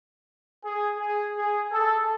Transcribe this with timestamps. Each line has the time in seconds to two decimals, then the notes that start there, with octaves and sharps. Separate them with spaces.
0.64 G#4
1.00 G#4
1.36 G#4
1.73 A4